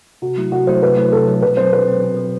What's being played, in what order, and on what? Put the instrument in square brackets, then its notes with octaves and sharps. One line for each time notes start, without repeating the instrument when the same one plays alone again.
[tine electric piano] C3 [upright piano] F#4
[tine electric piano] F#3 A3 E4
[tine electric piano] C3 [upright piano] F#4
[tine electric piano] F#3 A3 E4 [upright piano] C5
[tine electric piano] C3 [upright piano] B4
[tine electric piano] F#3 A3 E4
[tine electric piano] C3 [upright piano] A4
[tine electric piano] F#3 A3 E4
[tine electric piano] B2 [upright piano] B4
[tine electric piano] C4 [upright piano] C5
[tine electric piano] F#3
[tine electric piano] B2 [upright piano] B4
[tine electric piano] F#3 C4
B2
F#3 C4